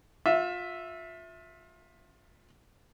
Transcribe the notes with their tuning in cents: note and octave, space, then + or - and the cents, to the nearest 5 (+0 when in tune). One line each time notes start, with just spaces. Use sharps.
F4 +30 E5 +0